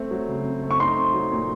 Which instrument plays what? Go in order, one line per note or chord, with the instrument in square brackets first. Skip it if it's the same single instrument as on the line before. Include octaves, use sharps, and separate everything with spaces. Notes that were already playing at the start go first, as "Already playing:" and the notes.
Already playing: [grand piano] A3 C4
F#3
C#3
C4
A3
[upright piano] C#6
[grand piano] D#4 [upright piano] C6
[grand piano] C4
F#3
A#2